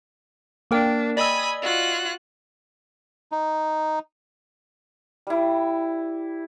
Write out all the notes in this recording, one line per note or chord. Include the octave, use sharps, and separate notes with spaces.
A#3 D4 A#4 G5
D5 D#5 G#5 B5 D#6 E6
F4 F#4 F#6
D#4
G3 E4